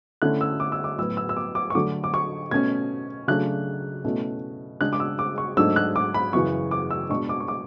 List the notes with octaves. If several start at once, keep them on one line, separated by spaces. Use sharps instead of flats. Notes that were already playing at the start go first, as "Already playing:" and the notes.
D3 A3 C#4 E4 F#6
E6
D6
E6
D6
A2 F#3 B3 E6
E6
E6
D6
D6
C#6
D3 F#3 A3 D4 D6
D6
C#6
B2 A3 C#4 G#6
C#3 F#3 A3 D4 F#6
B2 A3 C#4 E4
C#3 G#3 D4 F#6
D6
E6
D6
C#6
G#2 F#3 A3 D4 E6
F#6
D6
B5
F#2 C#3 E3 C#6
D6
E6
B2 G#3 D4 C#6
D6
C#6
D6